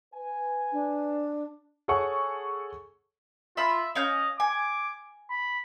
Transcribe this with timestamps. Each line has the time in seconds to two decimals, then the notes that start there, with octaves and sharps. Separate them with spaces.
0.14 B4 G#5
0.72 D4
1.88 G#4 A4 C#5 F#5 C#6
3.57 F4 E5 B5
3.95 C#4 D#5 F5 G6
4.40 G#5 D6
5.30 B5